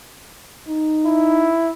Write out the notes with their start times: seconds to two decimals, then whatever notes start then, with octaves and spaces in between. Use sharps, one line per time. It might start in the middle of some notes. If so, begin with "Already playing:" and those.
0.68 D#4
1.06 E4